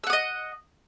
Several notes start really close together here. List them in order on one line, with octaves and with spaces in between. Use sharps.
E6 F#5 D#6 D#5